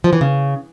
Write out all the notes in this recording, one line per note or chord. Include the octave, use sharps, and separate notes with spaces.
F3
E3
C#3